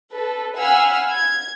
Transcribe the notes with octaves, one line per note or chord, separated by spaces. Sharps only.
A4 B4
F5 F#5 G#5 B5 E6 F6
G#6